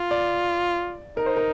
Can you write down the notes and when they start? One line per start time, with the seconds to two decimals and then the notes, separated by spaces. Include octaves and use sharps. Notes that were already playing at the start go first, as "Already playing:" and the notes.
Already playing: F4
0.11 D5
1.17 D#4 A#4
1.26 C5
1.36 A#4